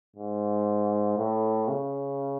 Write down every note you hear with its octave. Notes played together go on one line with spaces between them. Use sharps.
G#2
A2
C#3